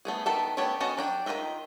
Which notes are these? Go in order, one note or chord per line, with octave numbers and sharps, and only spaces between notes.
A3 B3 G#4
D#3 B3 A4 E5 A5
A3 B3 G4 C#5 D5
B3 C#4 F#4 D#5 A5
F#3 D4 G5
D#3 F3 F4 D#5 E5